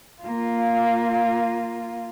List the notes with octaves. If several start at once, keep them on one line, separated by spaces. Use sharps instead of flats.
A#3 F4